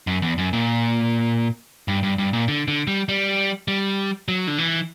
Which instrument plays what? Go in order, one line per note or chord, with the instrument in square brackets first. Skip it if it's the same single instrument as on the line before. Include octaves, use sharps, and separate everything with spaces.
[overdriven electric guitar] F#2
E2
F#2
A#2
G2
G2
G2
A#2
D3
D3
G3
G3
G3
F#3
D3
E3